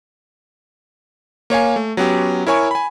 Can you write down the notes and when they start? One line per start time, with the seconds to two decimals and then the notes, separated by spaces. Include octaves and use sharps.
1.50 A#3 C#5 F5 G#5
1.76 A3
1.97 F#3 B3 C#4 G4
2.47 E4 A#4 C#5 G#5 C#6
2.71 G#5 B5